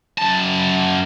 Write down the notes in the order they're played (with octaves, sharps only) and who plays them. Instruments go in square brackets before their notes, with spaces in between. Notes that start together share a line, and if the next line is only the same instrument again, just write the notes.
[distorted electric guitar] F#2 A5